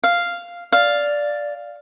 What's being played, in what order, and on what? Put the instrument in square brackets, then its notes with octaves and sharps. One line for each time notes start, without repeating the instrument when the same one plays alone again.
[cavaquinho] F5
[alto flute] D5 [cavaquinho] F5